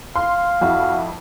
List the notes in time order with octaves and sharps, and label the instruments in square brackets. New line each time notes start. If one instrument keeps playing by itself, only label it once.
[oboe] F5 [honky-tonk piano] C6
[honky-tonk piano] F2 E4 [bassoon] F#4